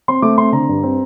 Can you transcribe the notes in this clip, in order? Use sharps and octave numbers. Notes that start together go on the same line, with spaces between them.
C4 C6
A3 D6
C4 C6
D3 A#5
G2
C4